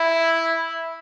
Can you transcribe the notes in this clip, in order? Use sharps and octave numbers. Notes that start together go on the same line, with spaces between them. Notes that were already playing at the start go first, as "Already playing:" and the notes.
Already playing: E4